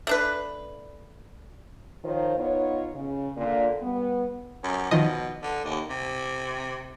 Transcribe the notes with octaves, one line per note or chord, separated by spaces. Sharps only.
A3 D4 B4
D#3 F3 F4 C5 C#5
B3 D#4 F4 C#5
C#3
A#2 D3
G3 B3
F#2
B2 D#3 F3 D#5
D3
D#2
C3